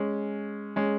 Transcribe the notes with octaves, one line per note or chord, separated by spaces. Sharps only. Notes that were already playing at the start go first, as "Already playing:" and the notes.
Already playing: G#3 C#4
G#3 C#4